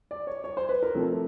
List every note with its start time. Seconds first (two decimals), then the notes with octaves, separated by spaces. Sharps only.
0.11 D5
0.27 C#5
0.44 C#5
0.57 C5
0.69 B4
0.83 A#4
0.95 C3 F3 A3